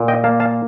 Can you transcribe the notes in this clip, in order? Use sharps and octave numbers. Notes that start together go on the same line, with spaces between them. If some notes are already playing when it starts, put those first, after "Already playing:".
Already playing: A#2
D#5 G5
A#3 F5 A5
F5 A5